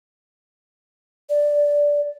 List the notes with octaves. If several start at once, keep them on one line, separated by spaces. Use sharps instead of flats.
D5